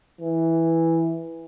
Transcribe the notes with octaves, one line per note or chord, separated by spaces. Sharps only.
E3